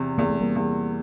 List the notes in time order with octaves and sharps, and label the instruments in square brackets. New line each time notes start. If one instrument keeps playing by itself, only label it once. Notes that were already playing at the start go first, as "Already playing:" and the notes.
Already playing: [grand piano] E2 C3
[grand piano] E2 [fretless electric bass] A#3
[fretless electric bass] A3
G3 A#3
[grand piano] E2